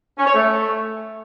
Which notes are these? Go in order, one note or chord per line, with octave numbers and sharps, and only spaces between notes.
C#4
C#5
A3